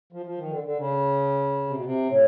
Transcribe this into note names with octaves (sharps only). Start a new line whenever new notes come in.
F3
F3
D#3
D3
D3
C#3
C3
B2
C3
A2